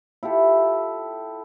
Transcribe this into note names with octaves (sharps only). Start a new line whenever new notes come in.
E4 F4 G4 A4